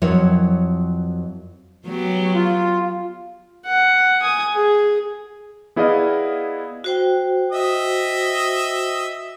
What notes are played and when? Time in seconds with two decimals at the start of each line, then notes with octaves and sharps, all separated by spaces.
0.02 F2 F#3 E4 A#4 C#5
1.86 F#3 B3 G4
2.34 F4
3.65 F#5
4.21 G#5 D#6
4.54 G#4
5.76 B3 E4 G#4 D5 D#5 F5
6.84 F#4 C5 G5
7.52 D#5 E5 D#6